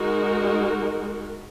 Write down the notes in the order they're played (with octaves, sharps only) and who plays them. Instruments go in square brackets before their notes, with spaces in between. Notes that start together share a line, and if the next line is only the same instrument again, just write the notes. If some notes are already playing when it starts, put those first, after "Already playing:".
Already playing: [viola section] G#3 D#4 F#4 A#4